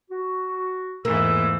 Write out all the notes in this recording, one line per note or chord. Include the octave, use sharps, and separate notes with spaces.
F#4
E2 G#2 E3 A3 A#3 G#4 E6